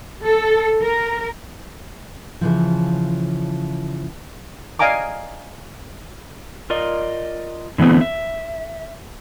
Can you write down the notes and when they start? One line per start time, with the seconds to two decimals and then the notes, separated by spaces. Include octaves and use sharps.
0.24 A4
0.81 A#4
2.41 C#3 E3 F3
4.79 D5 D#5 F5 G#5 A#5 D6
6.70 F4 A#4 D5 D#5
7.78 D3 E3 A3 B3 C4
8.01 E5